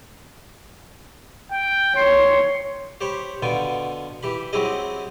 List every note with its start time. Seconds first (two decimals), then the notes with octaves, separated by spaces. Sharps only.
1.51 G5
1.96 C#5 C6
3.01 G4 C5 C#5 B5
3.42 B2 D3 B3 F4 G5 G#5
4.23 E3 G4 B5
4.53 F#3 C4 E4 G4 G#4 D#5